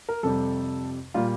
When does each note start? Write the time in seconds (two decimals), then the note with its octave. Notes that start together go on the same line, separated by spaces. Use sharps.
0.09 A#4
0.23 F2 C3 G3 A4
1.14 A#2 G3 A#3 F4